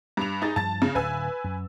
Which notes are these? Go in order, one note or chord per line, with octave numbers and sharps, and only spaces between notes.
G2 F7
D#4 G#4 A6
G2 F3 A5 A6
C#3
D1 D2 B4 G#5 E6
F#2